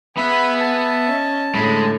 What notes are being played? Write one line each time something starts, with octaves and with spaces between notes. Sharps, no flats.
B3 G#4 B4 E5 F#5 B5
A5
C#4 D#5
A2 D3 G#3 B5